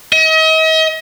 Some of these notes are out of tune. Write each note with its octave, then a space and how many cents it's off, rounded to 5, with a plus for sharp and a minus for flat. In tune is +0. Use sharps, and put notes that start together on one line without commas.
D#5 +40